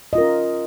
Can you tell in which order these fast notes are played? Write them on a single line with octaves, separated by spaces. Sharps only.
D#5 F4 A#4 C#4